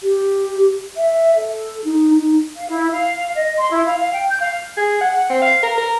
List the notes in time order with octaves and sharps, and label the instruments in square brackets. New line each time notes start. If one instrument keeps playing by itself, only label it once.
[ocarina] G4
E5
A4
D#4
D#4
[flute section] F5
E4
F5
D#5
C6
E4
F5
F5
G5
G6
F5
[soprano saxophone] G#4
F#5
F#5
C4
F5
A#4
A#4